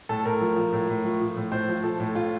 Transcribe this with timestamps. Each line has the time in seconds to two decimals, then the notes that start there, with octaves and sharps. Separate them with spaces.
0.09 A2 A4
0.25 A2 A#4
0.41 F3
0.57 F3
0.72 A2
0.89 A2
1.05 F3
1.20 F3
1.36 A2
1.52 A2 C5
1.68 F3
1.84 F3 A4
2.00 A2
2.15 A2 F4